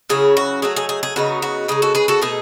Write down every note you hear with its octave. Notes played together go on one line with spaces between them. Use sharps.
C#3 F#3 C#4 E4 G#4
F#4
F#3 A3 D#4 G#4
G#4
G#4
G#4
C#3 F#3 B3 D#4 F#4
F#4
C#3 G#3 D#4 G#4
F#4 A4
G#4 B4
F#4 A4
B2 A3 D#4 G#4